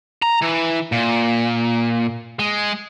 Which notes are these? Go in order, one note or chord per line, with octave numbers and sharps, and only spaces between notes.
A#5
E3
A#2
G#3